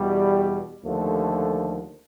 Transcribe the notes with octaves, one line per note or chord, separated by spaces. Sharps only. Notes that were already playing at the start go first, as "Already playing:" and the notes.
Already playing: E2 B2 G3
D#2 D3 F3 A3